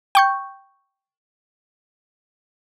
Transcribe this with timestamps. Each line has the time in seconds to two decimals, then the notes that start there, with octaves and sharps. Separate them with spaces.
0.15 G5 C#6 G6